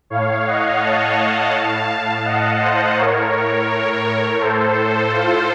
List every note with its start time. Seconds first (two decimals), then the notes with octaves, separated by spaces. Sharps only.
0.10 A2 C#5 F5
0.46 D#5 F#5
0.82 F5 A5
1.53 A2
2.25 D#5 F#5
2.61 C5 D#5
2.97 A2 A#4 C#5
4.40 A2 A4 C5
5.12 F4 A4